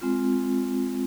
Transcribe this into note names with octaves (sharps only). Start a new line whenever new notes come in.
G#3 C4 F4